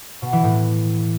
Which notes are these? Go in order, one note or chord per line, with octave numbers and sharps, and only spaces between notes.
B2
E3
A2